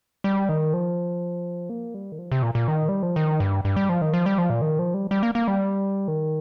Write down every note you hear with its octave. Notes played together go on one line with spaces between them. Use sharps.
G3
D#3
F3
A#3
G3
D#3
F3
C3
A#2
A#2
D#3
G3
F3
D#3
G2
G2
G3
F3
D#3
F3
G3
F3
A#2
D#3
F3
G3
G3
A#3
A#3
G3
D#3